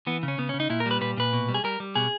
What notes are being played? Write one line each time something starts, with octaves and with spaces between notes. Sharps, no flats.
E3 B3
C#3
C#4
C#3 B3
C#4
C#3
D#4
A#2 E4
A#4
G3 B4
A#2 B4
A#2 B4
B2
G3
G#4
G3 A#4
G3
B2 G#4